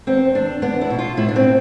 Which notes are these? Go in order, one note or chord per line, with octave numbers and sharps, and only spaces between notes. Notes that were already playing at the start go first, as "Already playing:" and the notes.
E2 C4
E2 D4
B3 D4
E4
B2
F4
A2 E4
D4
C4